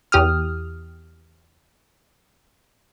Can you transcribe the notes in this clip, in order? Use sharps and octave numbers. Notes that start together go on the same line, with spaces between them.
E2 G4 D#6 F6